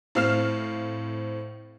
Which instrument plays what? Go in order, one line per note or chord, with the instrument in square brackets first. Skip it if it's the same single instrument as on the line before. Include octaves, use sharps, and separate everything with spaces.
[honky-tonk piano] A2 C4 F5 F6 C7 E7